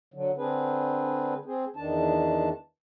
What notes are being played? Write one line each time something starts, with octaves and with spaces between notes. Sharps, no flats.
D3 F#3
D3 C4 D4 G#4 B4
C4 G#4
E2 D#3 D4 A5